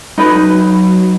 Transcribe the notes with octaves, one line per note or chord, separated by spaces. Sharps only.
F#3 D#4 B4